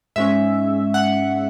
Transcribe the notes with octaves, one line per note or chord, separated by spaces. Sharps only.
G#2 G#3 C#4 E5
F#5